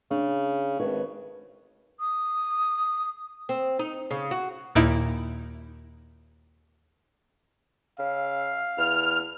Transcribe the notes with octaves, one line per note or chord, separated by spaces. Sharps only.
C#3 D4
G#1 B4 C#5
D#6
C4
D#4
C#3
F#4
D#2 A#2 D#4 E4 D7
C#3 F5
E2 F6